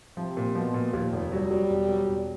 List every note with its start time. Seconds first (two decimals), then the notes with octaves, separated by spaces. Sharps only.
0.17 C3 F3
0.37 A#2
0.55 B2 F3
0.74 A#2
0.93 D#2 F3
1.12 F1
1.31 F#3 G3
1.51 F#3
1.70 E1
1.89 F#3
2.08 E1